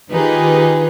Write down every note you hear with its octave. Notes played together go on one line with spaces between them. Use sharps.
D#3 D#4 F4 G4 G#4 B4